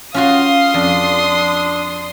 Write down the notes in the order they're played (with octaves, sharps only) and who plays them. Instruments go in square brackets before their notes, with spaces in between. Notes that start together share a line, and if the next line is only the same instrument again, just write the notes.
[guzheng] C#4 F4 F#4 [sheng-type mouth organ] F5 [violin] C6 D#6
[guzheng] F2 [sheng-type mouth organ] D4